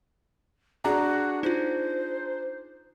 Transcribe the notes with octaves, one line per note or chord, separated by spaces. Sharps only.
D4 F#4 G#4 A#5
D#4 F4 C5